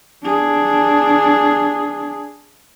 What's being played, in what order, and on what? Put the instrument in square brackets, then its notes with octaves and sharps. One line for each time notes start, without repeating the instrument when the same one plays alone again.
[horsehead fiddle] D4 G#4